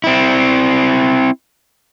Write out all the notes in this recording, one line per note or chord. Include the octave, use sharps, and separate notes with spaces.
C4 E4